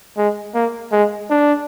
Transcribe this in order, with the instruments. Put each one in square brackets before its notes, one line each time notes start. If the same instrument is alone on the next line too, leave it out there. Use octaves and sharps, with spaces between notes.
[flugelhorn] G#3
A#3
G#3
D4